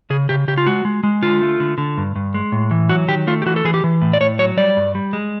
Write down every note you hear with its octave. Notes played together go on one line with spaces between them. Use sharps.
C#3 G#4
C#3 G4
C#3 G4
F4
G#3 F#4
G#3
G#3
D3 F4
A3
D3
D3
G2
G2
G#3
A2
E3
F#3 F#4
D#3 G4
A3 F4
G4
E3 F#4
A4
E3 G#4
G4
E3
A2
D5
A2 C#5
F#3 C#5
G3 D5
G2
G3
G#3